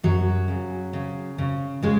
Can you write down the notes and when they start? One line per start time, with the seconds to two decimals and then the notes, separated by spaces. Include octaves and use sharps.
0.03 F#2 F#3
0.48 C#3
0.93 C#3
1.38 C#3
1.82 C#3 G#3